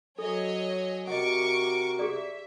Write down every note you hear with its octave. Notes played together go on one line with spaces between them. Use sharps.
F#3 A4 C#5 D#5 G#5
C3 F#4 A#4 D#5 F#5 C#6 D6
G4 G#4 D5 E5